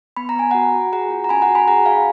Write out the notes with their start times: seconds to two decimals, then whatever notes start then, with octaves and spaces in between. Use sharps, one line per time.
0.17 B3 B5
0.29 A#5
0.36 B3 G#5
0.51 F#4 F#5 A#5
0.74 F#4
0.92 G#4 F#5 A#5
1.11 F4
1.24 A#5
1.29 C#4 G#5 B5
1.42 F#5 A#5
1.49 F#4
1.55 G#5 B5
1.68 G#4 F#5 A#5
1.86 G#4 F5 G#5